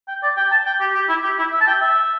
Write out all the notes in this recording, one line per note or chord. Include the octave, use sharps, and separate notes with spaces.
G5
D5
G5
A5
G5
G4
G4
E4
G4
E4
E5
A5
G5
E5